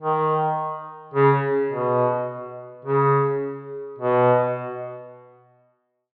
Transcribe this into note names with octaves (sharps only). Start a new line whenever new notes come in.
D#3
C#3
B2
C#3
B2